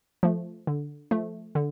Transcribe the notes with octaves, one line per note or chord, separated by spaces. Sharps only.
F3 A3
D3
F3 A3
D3